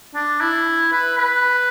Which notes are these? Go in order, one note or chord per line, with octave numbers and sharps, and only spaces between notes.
D4
E4
B4
B4